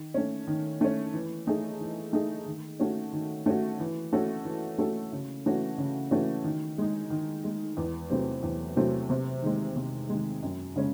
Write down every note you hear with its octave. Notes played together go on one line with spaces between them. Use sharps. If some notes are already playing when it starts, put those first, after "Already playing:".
Already playing: D#3
A3 C#4
D#3
A3 C#4
E3
A3 D#4 G#4
E3
A3 D#4 G#4
D#3
A3 C#4 F#4
D#3
A3 C#4 F#4
E3
A3 C#4 F#4 A4
E3
A3 C#4 F#4 A4
C#3
E3 A3 C#4 F#4
C#3
E3 A3 C#4 F#4
D#3
G#3 D#4
D#3
G#3 D#4
E2
C3 F#3 A3 C4
E2
C3 F#3 A3 C4
C3
D#3 G#3
C3
D#3 G#3
F#2
C#3 G#3 C#4